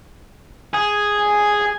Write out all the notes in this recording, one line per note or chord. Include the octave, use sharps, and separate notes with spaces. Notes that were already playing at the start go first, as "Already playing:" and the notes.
G#4
G#5